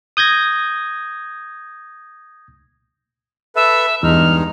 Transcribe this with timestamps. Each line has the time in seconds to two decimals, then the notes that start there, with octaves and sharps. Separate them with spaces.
0.17 D#6 G6 G#6 A#6
3.56 A4 B4 E5
4.03 E2 G2 G#3 D#4 F6